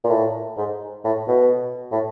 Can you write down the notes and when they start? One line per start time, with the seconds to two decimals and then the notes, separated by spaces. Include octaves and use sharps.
0.04 A#2
0.09 A2
0.57 G#2
1.04 A2
1.28 B2
1.91 A2